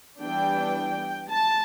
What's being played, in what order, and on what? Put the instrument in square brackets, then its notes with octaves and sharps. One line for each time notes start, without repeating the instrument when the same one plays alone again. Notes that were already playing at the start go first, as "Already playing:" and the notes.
[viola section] E3 G3 B3 D4 G5
A5